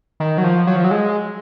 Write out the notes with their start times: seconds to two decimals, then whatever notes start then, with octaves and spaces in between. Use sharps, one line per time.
0.20 D#3
0.38 F#3
0.44 F3
0.67 F#3
0.76 F3
0.84 F#3
0.91 G#3